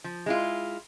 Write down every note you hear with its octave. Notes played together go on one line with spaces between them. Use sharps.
F3
G#3 E4 F4